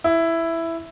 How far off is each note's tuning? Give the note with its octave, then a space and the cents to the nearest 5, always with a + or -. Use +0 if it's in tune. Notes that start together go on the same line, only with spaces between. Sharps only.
E4 +5